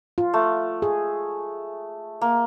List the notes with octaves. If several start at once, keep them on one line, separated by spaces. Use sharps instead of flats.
F4
A3
G#4
A#3